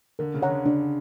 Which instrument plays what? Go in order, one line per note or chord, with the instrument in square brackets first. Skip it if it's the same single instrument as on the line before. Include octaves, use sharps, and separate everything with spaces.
[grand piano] D3 [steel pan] A#4
[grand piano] C#3
[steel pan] C#5 F#5 A#5
[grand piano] D3
[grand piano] C#3 [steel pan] D4